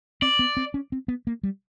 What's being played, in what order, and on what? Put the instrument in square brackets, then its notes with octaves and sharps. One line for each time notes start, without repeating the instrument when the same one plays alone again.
[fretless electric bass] C4 [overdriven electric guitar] D5
[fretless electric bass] B3
C4
C#4
C4
B3
A#3
G3